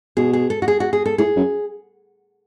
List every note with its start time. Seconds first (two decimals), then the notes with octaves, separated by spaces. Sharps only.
0.17 B2 G#4
0.33 G#4
0.50 A4
0.62 F#4
0.68 G#4
0.80 F#4
0.93 G#4
1.06 A4
1.18 A2 G#4
1.36 F#2